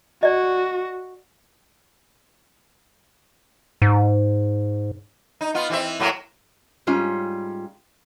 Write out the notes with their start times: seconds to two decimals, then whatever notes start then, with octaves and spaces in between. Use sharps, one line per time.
0.23 F#4 D5 D#5
3.82 G#2
5.41 D#4
5.54 B3 F4
5.70 E3 C4 E5
6.00 A2 F#3 A#3
6.87 G#2 G3 C#4 F4